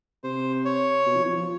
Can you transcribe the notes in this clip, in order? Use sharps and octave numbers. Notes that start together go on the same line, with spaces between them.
C3 C5
C#5
B2
F3
E3
F3
F3